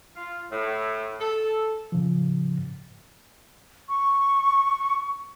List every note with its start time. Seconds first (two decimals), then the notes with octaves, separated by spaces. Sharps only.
0.16 F4
0.51 A2
1.20 A4
1.92 A2 C#3 F3
3.89 C#6